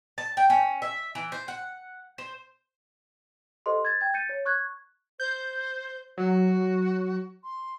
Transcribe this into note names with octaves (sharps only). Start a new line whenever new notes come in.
A5
G5
C#4
E5
E3
C5
F#5
C5
G4 A4 C5 D#5 C6
G#6 A6
G5 G#6
G6 A6 C#7 D#7
C#5
C#6 F#6 G#6
C5 G6
F#3 F#4
C6